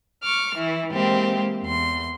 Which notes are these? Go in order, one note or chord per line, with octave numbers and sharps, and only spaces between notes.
C#6 D6 F6
E3 E4
E3 G#3 A#3 C4 G4
E2 C6